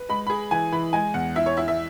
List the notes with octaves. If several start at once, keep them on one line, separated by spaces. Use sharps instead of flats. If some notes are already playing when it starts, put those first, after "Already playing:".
Already playing: B4
G#3 B5
G#4 B5
E3 G#5
E3 B5
G#3 G#5
E2 F#5
E4 E5
C#5
E4 E5
E5